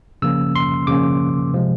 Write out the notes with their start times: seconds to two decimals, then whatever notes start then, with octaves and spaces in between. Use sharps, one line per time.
0.22 C#3 F3 A#3 C#4 E6
0.56 C6
0.87 C#3 F3 A#3 C#4 D6
1.53 C3 F3 G#3